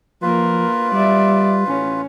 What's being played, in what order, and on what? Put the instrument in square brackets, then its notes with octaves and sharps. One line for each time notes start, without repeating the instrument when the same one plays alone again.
[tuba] F3 [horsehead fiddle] A#3 A#4 [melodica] F4 B4
[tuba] G3 [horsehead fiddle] D5 E5
[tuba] A1 [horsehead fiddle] C#4